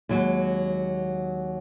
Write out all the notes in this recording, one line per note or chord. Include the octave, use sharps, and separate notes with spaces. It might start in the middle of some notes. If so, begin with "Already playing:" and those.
D#2 F#3 G#3